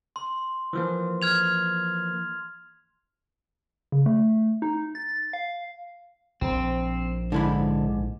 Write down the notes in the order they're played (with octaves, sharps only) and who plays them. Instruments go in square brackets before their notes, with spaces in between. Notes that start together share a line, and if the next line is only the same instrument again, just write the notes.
[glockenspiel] C6
[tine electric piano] E3 F3 A#3
[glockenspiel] F6 G#6 F7
[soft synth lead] C#3
A3
D#4
A6
F5
[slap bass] A#1 F3 [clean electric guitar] C4
[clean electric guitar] G#2 [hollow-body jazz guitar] D3 E4 B5